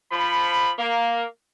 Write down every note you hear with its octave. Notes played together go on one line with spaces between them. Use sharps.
F3 B5
A#3